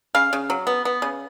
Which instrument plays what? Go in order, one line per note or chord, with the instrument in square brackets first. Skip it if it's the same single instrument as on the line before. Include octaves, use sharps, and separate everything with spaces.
[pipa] C#3 F5
C#3
F#3
B3
B3
C#3